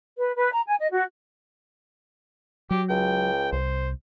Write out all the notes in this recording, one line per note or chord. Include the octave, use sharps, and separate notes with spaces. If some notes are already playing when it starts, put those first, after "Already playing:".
B4
B4
A#5
G#5
D#5
F#4
F#3 G4
C#2 G5
C2 C5